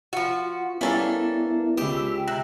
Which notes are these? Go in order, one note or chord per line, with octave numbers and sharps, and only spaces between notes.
F3 F4 F#4
G3 A#3 B3 C#4 D4 E4 A4 B5
C#2 G4 B5 D#6 E6
C3 A#5 E6 F#6